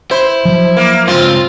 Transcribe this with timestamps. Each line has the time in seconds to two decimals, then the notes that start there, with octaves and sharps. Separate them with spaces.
0.11 E4 C5
0.45 F3 F#3
0.77 A#3
1.07 C#2 G2 C4 F4